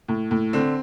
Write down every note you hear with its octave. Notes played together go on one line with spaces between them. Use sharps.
A2
A2
D3 C4